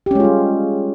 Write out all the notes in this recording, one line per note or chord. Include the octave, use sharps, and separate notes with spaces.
G3 G#3 C#4 F4 G4